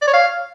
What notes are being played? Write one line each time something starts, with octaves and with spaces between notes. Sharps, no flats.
D5
C#5
F5